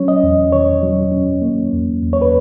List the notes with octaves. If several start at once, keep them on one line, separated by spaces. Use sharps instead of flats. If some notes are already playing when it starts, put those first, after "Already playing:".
Already playing: F#3 C#4 C#5
D#5
E2
D#3 C#5
F#3
C#4
A#3
E2
E2
C#5
B4